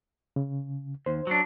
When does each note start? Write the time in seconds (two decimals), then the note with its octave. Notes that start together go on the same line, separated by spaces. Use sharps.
0.36 C#3
1.06 D#2 C5
1.27 F#3 D4